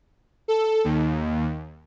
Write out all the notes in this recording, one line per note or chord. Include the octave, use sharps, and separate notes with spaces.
A4
D#2